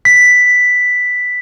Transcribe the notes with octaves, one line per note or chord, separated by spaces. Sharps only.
B6